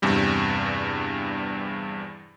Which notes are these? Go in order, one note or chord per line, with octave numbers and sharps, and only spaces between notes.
E2 G2 C3